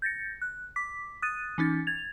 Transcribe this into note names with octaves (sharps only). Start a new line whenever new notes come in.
G6 A6 A#6 C#7
F#6
D6 B6
D#6 F#6 A6 D#7
E3 C#4 D#4 A6
G#6 A6 F7